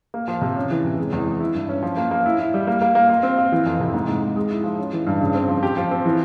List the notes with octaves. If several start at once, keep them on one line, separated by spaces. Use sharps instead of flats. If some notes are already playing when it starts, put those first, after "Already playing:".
A#3
F3
C3
C#4
E3
C3
G#3
E2
G#3
E4
G2
C#4
F3
A#3
A#3
E4
E4
G3
A#3
A#3
A#3
F4
C4
F4
E3
F2
C3
G#2
G#2
G#2
G#3
E4
F3
C#4
E3
G2
C#3
C4
F3
G4
F3
C4
E3